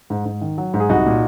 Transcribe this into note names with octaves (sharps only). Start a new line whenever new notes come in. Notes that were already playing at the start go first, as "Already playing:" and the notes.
G#2
G#2
D#3
F#3
G#2
G#4
C2 D#4 F#4
A#2